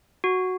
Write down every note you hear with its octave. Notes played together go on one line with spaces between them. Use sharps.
F#4